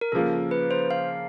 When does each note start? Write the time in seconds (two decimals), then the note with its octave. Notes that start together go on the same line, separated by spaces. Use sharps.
0.01 A#4
0.12 C#3 F3 A#3 A4
0.51 B4
0.71 C5
0.91 F5